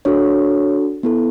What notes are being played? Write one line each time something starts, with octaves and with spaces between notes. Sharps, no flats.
D4 F#4 A4 C#5
B3 E4 A4